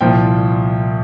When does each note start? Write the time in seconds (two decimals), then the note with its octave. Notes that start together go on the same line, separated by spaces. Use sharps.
0.01 C2 A#2 F3 G5